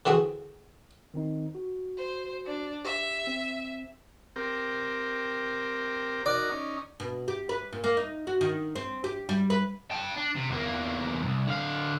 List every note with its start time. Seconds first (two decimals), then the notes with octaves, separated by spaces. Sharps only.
0.06 D3 E3 C4 F#4 G#4
1.14 D#3 C4 D#4
1.55 F#4
1.97 C5
2.46 D4
2.85 G4 E5
3.27 C4
4.36 C4 G4 A#4
6.26 D#4 F#4 A#4 D5
6.52 C#4 D#4
7.00 B2
7.28 G4
7.49 B4
7.73 A#2
7.84 A#3
7.97 D#4
8.27 F#4
8.41 D#3
8.75 C4
9.04 G4
9.29 G3
9.50 B4
9.91 G5 A5
10.16 D4
10.36 C3
10.50 E2 A#3
11.22 C2 F#2
11.47 D3 F5